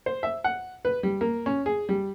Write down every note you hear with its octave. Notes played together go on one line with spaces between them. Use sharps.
C5
E5
F#5
B4
G3
A#3
C#4
G#4
G3